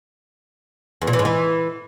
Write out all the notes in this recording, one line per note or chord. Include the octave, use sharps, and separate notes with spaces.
E2
A#2
E3
G#2
E3